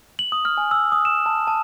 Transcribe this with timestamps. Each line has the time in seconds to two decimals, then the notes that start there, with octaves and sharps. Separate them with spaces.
0.19 F#7
0.32 D#6
0.45 F6
0.58 G#5
0.71 E6
0.92 D#6
1.05 E7
1.26 A5
1.47 A5